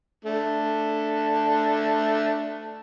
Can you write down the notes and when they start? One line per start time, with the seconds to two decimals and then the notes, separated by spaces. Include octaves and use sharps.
0.25 A3 D4